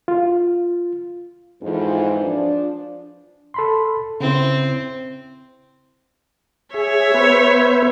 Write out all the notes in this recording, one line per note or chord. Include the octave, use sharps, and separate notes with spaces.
F4
F2 G#2 E3
F3 D4
A4 B5 C6
C#3 C4 E4
G#4 C#5 E5
B3 B4 C5